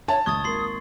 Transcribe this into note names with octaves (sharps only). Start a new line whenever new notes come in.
C#5 E5 A5
C#2 C#6 D#6 G#6 A6
G#1 A#3 C6 C7